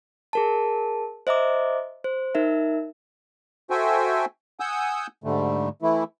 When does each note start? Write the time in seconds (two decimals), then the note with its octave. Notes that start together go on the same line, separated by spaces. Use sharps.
0.33 G#4 A#4 A5
1.27 C5 D#5 E5 A#5 D6
2.04 C5
2.35 D#4 A#4 E5
3.70 F#4 A4 C5 E5 G5 G#5
4.60 F#5 G#5 D#6 E6 G6
5.24 G#2 D3 G3 A3
5.82 E3 A3 E4